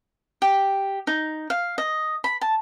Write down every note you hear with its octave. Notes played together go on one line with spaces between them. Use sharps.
G4
D#4
F5
D#5
B5
A5